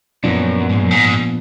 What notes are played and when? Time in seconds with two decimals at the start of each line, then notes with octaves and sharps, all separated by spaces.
0.24 F#2 A#2 F3 B3 D4
0.70 G#2
0.81 F#2
0.91 G#2